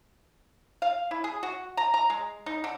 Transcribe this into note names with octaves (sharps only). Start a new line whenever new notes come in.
F5
E4
G#4
F#4
A#5
A#5
G#3
D#4
D3